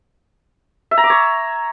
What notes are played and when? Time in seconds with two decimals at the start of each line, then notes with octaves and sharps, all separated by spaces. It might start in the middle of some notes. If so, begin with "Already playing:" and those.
0.91 E5
0.97 A#5
1.04 D6
1.10 C#5